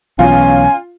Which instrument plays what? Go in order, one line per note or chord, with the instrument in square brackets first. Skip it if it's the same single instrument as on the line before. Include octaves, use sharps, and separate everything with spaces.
[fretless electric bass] B1 E3 B3 [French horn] C#4 [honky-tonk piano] F4 [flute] G#5